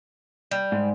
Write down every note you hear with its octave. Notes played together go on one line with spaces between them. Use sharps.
G3
G#2